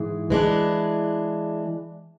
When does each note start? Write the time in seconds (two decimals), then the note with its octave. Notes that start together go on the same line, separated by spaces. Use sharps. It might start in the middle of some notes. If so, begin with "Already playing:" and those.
Already playing: G#2 E3 G#4
0.30 E3 G#3 D4